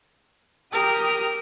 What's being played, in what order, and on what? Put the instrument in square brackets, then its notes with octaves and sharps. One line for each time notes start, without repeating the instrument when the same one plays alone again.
[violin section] G4 D#6 [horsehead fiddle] A#4